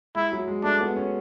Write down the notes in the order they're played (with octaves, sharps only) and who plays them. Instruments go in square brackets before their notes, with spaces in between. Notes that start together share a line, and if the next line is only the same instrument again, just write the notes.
[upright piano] G#3 [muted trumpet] E4
[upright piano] F#3
G#3
[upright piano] A3 [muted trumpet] D4
[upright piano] B3
C#4